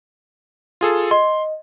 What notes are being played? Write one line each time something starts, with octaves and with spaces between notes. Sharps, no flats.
F4 G#4 A4
D#5 C6